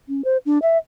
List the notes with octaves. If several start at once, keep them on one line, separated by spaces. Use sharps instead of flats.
C#4
C5
D4
E5